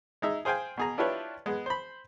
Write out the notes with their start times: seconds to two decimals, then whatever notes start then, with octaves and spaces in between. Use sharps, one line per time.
0.22 G#3 D#4 E5
0.45 G#4 C5 F5 G5 G#5
0.77 B2 G#4 A#5
0.98 D4 E4 F4 G4 B4 C#5
1.46 G#3 B3
1.66 C5 B5